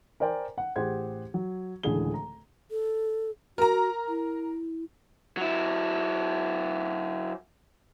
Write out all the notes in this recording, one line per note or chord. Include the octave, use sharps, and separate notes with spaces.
A#4 C5 D5 G5 G#5
F#5
A1 G4 G#4 C5 F#5 G#6
F#3
D1 C#2 D3 E3 G#4 G7
A#5
A4
F#4 A#4 A#5
E4
F#3 E4